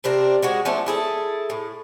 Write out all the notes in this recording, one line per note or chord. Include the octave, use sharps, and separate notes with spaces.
C3 C4 D4 A#4
G#3 F#4 G#4
F3 A3 C#4 D4
E4 G#4 A4
A2